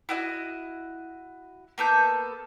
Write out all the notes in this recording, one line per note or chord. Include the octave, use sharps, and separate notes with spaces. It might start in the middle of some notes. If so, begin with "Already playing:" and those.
E4 F#4 D#5
A#3 B3 A4 G6